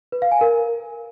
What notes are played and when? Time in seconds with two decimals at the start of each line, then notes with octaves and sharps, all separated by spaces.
0.12 B4
0.22 F5
0.32 G#5
0.41 A#4